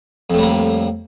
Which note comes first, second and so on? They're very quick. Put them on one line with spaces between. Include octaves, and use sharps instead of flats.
F2 A2 G3 A#3